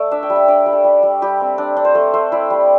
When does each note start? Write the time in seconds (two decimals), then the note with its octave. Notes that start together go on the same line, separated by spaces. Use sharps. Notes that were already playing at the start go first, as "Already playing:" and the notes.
Already playing: A3 D5 A5
0.11 D4 E5
0.23 G5
0.30 G3
0.36 E5
0.48 D4 D5
0.66 G3
0.73 A4
0.84 G3
1.03 G3
1.22 G3 G4
1.41 C4
1.58 D4
1.77 D4
1.85 C5
1.95 A3 A4
2.14 A3 C5
2.32 E4 D5
2.50 G3